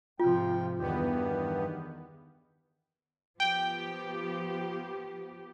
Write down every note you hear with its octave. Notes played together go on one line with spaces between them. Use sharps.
G#2 C3 F3 F4 G5
E2 G2 D#3 B3 G4
F3 B3 G4 G5